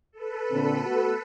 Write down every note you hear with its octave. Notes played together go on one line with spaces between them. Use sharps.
A4 B4
A#2 D3 C4
A3 B3 F#4